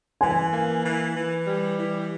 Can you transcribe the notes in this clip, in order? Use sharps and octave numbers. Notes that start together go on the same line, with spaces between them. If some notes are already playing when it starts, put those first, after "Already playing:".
E3 G#5
A#3
E3
E3
G3
E3